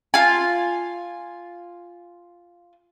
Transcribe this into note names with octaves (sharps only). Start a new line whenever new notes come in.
F4 G#5